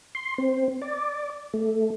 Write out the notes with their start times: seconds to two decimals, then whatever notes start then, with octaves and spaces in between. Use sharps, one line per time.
0.15 C6
0.38 C4
0.82 D5
1.54 A3